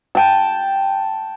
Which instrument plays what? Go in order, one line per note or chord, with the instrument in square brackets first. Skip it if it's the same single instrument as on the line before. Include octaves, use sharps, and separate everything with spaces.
[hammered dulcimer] G5 A5